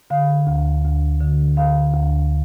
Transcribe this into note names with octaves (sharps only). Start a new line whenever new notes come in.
D3 F5
D2
D2
D3
D3 F5
D2